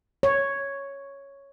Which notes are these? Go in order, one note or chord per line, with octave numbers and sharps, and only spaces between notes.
C#5